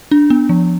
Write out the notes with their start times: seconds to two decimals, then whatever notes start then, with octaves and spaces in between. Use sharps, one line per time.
0.11 D4
0.30 B3
0.49 F3